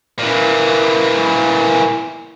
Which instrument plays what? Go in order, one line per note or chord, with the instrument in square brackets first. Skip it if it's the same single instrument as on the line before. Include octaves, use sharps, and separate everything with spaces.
[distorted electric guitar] A#2 E3